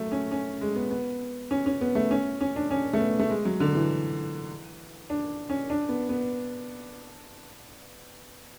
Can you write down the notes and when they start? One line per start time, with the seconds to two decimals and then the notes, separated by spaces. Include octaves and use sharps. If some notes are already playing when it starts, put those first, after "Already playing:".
Already playing: F#3 A3
0.12 C#4
0.32 C#4
0.61 G#3
0.76 B3
0.91 B3
1.51 C#4
1.66 C#4
1.81 B3
1.95 A3
2.11 C#4
2.41 C#4
2.56 D4
2.71 C#4
2.93 A3
3.00 B3
3.20 A3
3.30 G#3
3.45 F#3
3.60 D3
3.75 E3
5.10 D4
5.50 C#4
5.70 D4
5.89 B3
6.09 B3